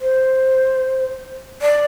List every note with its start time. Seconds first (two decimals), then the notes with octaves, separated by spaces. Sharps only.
0.01 C5
1.62 D5